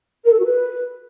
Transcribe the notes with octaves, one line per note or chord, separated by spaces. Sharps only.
A#4
A4
F#4
B4